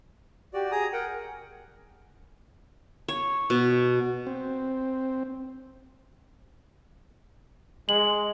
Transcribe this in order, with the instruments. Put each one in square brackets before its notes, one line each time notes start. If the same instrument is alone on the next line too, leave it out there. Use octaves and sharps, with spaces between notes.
[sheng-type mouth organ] F#4 D5 [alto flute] G4
[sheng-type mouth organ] G#4 A#5 D#6 [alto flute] G#5
[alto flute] A#4 [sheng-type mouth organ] F#5 G5
[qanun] C#5
B2
[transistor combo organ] C4
[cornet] G#3 [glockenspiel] F#7